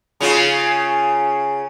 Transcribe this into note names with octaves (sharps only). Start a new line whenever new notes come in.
C#3 C#4 F4